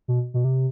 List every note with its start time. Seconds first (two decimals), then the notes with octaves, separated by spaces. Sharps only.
0.08 B2
0.34 B2
0.45 C3